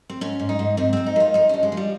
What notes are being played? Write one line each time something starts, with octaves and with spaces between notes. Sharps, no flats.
C4
G#2 C#4
G#2
D#4
G#2
G#2 C4
G#2 C4
D#4
D#3 F4
F3 D#4
G2 C#4
G#3
F3
G3